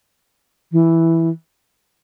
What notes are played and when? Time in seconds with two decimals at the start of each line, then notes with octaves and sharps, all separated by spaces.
0.72 E3